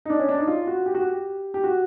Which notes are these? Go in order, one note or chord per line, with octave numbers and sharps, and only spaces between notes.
D#4
D4
C#4
D4
D#4
F4
F#4
G4
F#4
G4
G4
F#4